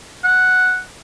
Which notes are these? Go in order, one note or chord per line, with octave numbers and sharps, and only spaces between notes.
F#5